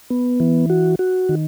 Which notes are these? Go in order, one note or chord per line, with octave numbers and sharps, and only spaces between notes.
B3
E3
F#4
F#4
D#3